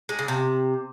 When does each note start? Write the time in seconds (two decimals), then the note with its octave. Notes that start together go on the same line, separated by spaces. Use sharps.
0.09 G#3
0.19 C#3
0.28 C3